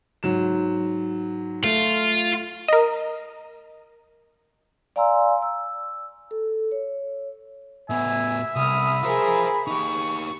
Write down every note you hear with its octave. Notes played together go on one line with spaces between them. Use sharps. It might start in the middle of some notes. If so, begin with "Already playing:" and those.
G#2 F#3 E7
A3 F4
A#4 D#5
D5 F5 G#5 A#5 C6 E6
E6
A4
C#5
A2 B3 E5 G#5
C2 B5 D#6 F6
F4 G#4 A#4 C5
D#4 G4 C#6